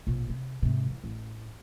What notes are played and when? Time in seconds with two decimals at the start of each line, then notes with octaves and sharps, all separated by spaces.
0.07 A#1 B2
0.29 C3
0.63 G#2 C3
0.90 E3
1.04 A1